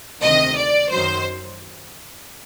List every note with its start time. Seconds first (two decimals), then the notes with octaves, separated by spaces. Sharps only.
0.23 D2 C3 D#3 D#5
0.58 D5
0.92 F#2 D#3 F#3 C5